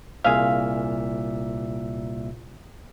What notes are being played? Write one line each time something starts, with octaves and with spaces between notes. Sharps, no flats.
C2 A#2 G#4 E5 F5